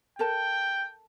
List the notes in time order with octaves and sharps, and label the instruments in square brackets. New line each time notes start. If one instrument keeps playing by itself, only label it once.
[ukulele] A4 A#4 A5 [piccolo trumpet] G5